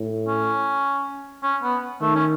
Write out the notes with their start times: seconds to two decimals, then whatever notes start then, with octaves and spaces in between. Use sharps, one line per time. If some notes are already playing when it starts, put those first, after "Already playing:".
Already playing: A2
0.28 C#4
1.43 C#4
1.63 B3
2.01 D#3 A3
2.15 C#4